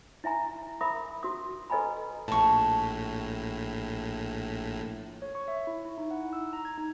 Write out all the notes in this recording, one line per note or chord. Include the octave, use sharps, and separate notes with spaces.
E4 E5 G#5 A#5
A#4 E5 A#5 B5 D#6
F#4 D#6
A4 B4 D#5 G#5 A#5 B5
A#1 A2 A5 C#6
C#5
C#6
E5
E4
E4
D#4
F#5
E6
A#5
G#6
D#4